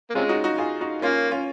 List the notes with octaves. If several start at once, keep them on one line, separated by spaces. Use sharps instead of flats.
A#3
C3 G#3 C#4 F4
D#4 F#4
D#4 F#4
F4 G#4
D#4 F#4
A#3 C#4 F4
C#4 F4